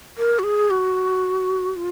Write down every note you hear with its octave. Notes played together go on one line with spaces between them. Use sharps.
A#4
F#4
G#4
F#4
F4